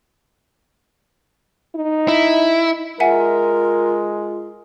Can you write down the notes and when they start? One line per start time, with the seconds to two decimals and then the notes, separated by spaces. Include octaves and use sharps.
1.75 D#4
2.08 E4
3.00 G#3 F4 A#4 E5 F#5 G#5